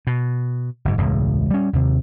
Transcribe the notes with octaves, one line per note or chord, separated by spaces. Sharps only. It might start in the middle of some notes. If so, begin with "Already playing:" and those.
B2
F#1 G#2
E1 C#2 A2
G3 C#4
D#2 C3